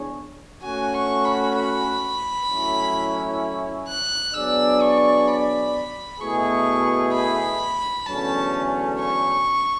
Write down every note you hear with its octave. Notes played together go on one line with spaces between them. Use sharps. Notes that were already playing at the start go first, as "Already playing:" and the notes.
Already playing: E3 B3 D4 G#4 C#5
A3 C#4 F#4 G#5
C#6
B5
B5
A2 F#3 C#4 E4
F#6
F#3 B3 D4 G#4 D5 E6
C#6
B5
B2 A3 E4 G#4 C#6
B5
E2 D3 F#3 A3 C#4 A5
C#6